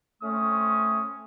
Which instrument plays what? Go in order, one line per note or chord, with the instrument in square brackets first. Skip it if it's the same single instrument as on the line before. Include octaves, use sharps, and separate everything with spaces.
[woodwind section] A3 [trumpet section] C4 C#4 D#6